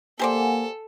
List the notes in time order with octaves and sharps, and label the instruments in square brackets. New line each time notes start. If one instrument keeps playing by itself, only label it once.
[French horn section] A#3 [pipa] G4 C5 D5 [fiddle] A4 [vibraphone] F#5 G#5